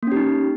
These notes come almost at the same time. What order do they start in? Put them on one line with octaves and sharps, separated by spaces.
A#3 C#4 G4 D#4